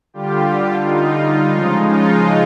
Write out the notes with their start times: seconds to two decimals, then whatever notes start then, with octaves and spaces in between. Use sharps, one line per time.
0.14 D3 G3 F4 G4
0.83 D#4 F4
1.53 C#3 F3 G#3
1.86 D#4 F4